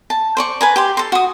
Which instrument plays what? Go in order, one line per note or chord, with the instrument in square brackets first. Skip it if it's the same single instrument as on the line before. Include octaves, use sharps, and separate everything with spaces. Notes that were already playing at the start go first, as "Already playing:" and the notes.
[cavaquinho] A5
C5 D5 C#6
B4 G#5 A#5
G4 G5 C6
A4 C6
F#4 D#6